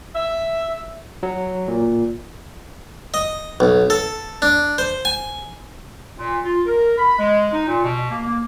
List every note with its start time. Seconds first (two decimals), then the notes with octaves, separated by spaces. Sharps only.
0.15 E5
1.23 F#3
1.68 A#2
3.14 D#5
3.60 B1
3.90 A4
4.42 D4
4.78 C5
5.05 G#5
6.18 A#2
6.44 F4
6.66 A#4
6.98 B5
7.18 G#3
7.52 D#4
7.67 A#2
7.84 B2
8.10 A#3
8.27 A#3